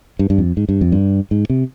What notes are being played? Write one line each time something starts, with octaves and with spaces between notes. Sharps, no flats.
G2
G2
F2
G#2
G2
F2
G2
G#2
C3